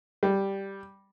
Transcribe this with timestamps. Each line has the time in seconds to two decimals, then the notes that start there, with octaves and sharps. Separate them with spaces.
0.23 G3